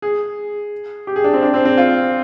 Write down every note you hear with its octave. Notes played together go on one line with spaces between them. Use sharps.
G#4
G4
G#4
D4
C4
D4
C4
C4
F4